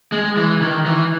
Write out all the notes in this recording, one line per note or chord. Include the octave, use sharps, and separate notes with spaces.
G#3
E3
D#3
E3